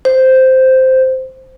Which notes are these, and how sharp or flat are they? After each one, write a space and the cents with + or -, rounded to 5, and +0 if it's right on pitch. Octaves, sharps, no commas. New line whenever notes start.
C5 -5